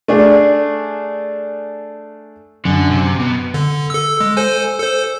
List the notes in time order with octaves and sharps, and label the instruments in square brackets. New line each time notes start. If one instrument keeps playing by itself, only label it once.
[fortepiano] A3 D4 G#4
[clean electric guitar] F#2 [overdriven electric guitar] D3
[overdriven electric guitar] C3
B2
[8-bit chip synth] D3
A4 E6
G#3
A4 C5 G#5
A4 C5